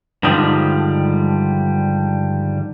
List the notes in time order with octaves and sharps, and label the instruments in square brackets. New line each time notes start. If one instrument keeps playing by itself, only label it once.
[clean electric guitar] G2 D3 D#3 F3 G3 G#3